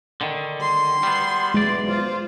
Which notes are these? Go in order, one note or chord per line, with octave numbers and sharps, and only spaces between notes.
D3 D#3
C6
G3 B3
B1 E2 G#3 D5
F4 C5